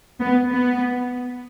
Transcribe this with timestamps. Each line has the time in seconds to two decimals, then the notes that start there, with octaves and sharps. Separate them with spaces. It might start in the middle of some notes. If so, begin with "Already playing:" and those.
0.20 B3
0.51 B3